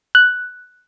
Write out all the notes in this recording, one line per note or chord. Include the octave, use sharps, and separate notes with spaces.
F#6